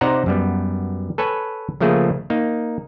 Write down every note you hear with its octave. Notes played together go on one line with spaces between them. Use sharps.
C3 D#4 C5 D5 F#5 A#5
F#2 G3 B3
A4 B4 C#5 G#5
C#3 F3 A3 A#3 G#4
A#3 D#4